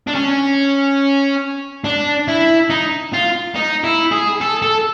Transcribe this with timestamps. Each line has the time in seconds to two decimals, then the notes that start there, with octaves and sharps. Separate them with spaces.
0.07 D4
0.15 C#4
1.84 D4
2.28 E4
2.70 D#4
3.13 F4
3.55 D#4
3.84 E4
4.11 G#4
4.41 A4
4.62 A4